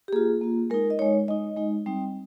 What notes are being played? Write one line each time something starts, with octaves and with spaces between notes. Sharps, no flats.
G4
A#3 F4 G#4
A#3 F4
G#3 D#4 A#4
D#5
G#3 D#4 C#5
G#3 D#4 D#5
G#3 D#4
G3 C4 D#4